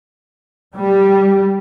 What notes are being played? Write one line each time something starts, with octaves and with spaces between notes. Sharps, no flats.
G3